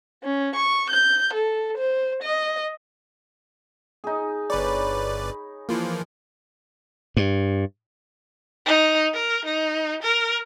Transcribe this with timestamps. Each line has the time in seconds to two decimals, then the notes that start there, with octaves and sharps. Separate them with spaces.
0.23 C#4
0.55 C#6
0.90 G6
1.34 A4
1.77 C5
2.23 D#5
4.04 D#4 G#4
4.50 G1 B4 C#5 D5 B5
5.69 E3 F3 A#3
7.17 G2
8.66 D#4
9.14 A#4
9.45 D#4
10.03 A#4